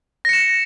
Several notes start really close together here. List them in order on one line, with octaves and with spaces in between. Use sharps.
A#6 C#7 E7